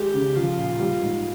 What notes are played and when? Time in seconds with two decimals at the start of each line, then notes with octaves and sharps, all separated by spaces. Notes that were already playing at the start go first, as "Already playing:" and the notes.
Already playing: G#3 G4
0.14 C#3
0.36 F3 F4
0.57 A#2
0.79 G3
1.02 G#2